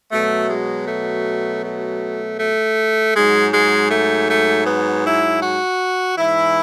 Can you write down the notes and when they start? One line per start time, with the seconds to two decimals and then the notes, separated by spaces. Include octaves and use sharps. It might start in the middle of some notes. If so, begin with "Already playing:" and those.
0.11 B2 F#3 A3
0.48 G#3
0.87 A3
1.63 A3
2.39 A3
3.14 G#2 F#3 G#3
3.53 G#3
3.91 A3
4.29 A3
4.66 B3
5.05 E4
5.42 F#4
6.18 G#2 E3 E4